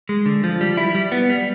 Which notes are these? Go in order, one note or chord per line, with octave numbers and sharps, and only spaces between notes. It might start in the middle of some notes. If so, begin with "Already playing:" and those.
G#3
D3
F3
G3
E4
G3
B3
G3